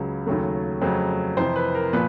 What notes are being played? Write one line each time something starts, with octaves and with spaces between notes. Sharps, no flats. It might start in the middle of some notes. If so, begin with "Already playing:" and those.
Already playing: C#2 C#3 F#3
D#2 C#3 F#3 A3
F2 C#3 F#3 A3
F2 C3 E3 C5
B4
A#4
A#2 F3 B4